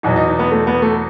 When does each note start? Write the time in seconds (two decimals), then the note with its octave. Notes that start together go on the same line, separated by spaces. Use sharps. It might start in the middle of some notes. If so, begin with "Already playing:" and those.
0.03 E2 B2 F#3 D#4
0.16 D#4
0.27 D#4
0.39 B3
0.51 A3
0.67 B3
0.82 A3